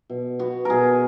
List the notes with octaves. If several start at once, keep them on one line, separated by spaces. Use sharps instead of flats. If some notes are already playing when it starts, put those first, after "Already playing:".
B2
B3 F#4
B2 G#4 A#4